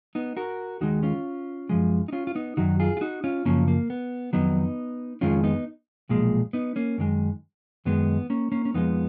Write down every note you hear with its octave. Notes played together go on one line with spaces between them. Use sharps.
B3 D#4
F#4 A#4
D#2 D#3 G#3 D#4 F#4
C#4 F4
F#2 F3 G#3
D#4
C#4 F4
F4
B3 D#4
F#2 D#3 F#3 D#4 F#4
F4 G#4
F4
D#4 F#4
C#4 F4
F#2 C#3 F3 A#3 C#4
A#3
B3
F2 D#3 F#3 B3 D#4
F2 D#3 G#3 C#4 F4
B3 D#4
B1 A#2 F3 G#3
B3 D#4
A#3 C#4
F#2 D#3 G#3
F#2 D#3 G#3 B3
A#3 C#4
A#3 C#4
C#4
F2 F3 G#3 B3 D#4